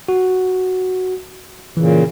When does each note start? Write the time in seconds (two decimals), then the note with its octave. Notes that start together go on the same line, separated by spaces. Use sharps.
0.08 F#4
1.77 A#2 C#3 E3